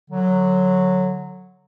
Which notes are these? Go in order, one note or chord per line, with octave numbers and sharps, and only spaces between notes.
D3 F#3